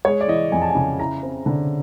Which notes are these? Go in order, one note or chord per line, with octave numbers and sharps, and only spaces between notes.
G#3 C#5
D5
E3 D#5
F2 G#5
A5
C#3 G#5
E4 A#5
C4
D3